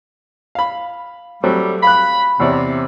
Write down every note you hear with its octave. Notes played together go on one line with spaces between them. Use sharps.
F5 B5
F#3 G3 A3 C4
F5 B5 F#6
E2 C3 C#5 D5